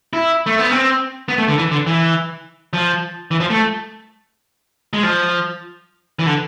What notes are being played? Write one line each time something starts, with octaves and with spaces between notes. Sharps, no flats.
E4
A3
B3
C4
B3
A3
D3
E3
D3
E3
F3
E3
F3
A3
G#3
F3
E3
D3